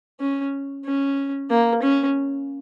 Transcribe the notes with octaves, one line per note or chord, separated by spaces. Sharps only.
C#4
C#4
A#3
C#4